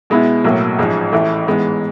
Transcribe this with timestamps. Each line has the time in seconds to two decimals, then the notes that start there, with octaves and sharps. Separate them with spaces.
0.10 B2 G#3 B3 E4
0.44 B1 A2 F#3 A#3
0.78 A1 G#2 F3 G#3
1.12 A1 A2 E3 A3
1.46 G#2 E3 G#3 B3